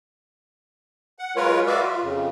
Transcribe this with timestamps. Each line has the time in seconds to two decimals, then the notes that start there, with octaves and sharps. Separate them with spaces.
1.19 F#5
1.36 F#3 G#3 F4 A#4 B4 C#5
1.67 F#4 B4 D5 E5 F5
1.82 F4
2.02 F2 C#3